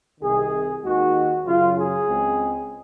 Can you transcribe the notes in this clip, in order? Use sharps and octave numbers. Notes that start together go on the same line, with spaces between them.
C2 C3 D#3 G#4
D#2 D#3 G#3 F#4
F#2 C#3 F#3 F4
G#4
C#2 C#3 G#3 C4